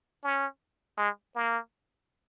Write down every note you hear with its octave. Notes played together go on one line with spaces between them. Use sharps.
C#4
G#3
A#3